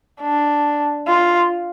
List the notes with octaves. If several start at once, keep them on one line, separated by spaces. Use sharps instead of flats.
D4
F4